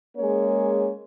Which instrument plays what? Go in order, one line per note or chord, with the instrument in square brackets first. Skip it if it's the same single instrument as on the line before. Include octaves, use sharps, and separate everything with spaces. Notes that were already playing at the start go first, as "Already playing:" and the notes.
[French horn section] G#3 A#3 C#4 G#4 C#5